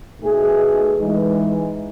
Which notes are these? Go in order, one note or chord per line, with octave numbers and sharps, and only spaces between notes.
B2 A3 D#4 G#4
E3 G#3 D#4